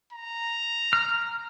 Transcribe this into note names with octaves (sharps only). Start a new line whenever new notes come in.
A#5
F6